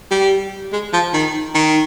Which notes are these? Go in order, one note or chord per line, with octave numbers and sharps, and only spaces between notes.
G3
G#3
F3
D#3
D#3